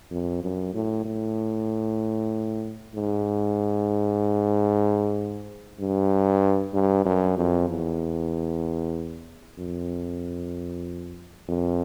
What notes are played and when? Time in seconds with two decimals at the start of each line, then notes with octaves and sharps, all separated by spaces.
0.11 F2
0.42 F#2
0.74 A2
1.05 A2
2.95 G#2
5.80 G2
6.74 G2
7.06 F#2
7.37 F2
7.69 E2
9.59 F2
11.48 F2